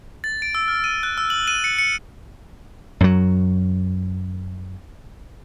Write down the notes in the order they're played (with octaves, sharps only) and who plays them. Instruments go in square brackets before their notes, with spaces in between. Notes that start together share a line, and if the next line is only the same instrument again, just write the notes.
[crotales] A6
D7
E6
F6
D#7
F#6
E6
F#7
D#7
C#7
C#7
[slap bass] F#2 F#3